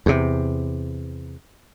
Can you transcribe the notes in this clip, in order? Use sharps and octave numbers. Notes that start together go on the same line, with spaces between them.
E2 C3